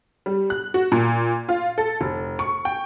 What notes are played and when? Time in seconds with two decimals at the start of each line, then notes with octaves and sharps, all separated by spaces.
0.26 G3
0.50 F#6
0.74 F#4
0.92 A#2
1.49 F4
1.78 A4
2.01 F1
2.39 C#6
2.65 G5